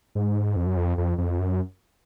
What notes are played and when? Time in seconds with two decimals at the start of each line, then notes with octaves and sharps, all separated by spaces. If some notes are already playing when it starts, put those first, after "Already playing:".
0.15 G#2
0.56 F2
0.66 F#2
0.77 F2
0.98 F2
1.18 F2
1.39 F#2